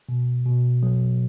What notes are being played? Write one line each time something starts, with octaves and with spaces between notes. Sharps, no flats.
B2
B2
F#3